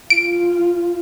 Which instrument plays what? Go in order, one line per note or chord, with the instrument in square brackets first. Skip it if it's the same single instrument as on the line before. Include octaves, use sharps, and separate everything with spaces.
[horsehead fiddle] F4 [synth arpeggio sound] D7